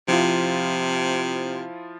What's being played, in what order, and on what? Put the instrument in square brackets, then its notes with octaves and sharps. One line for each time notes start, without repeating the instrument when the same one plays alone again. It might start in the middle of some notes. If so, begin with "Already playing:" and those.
[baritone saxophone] C3 [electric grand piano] F3 E4 F4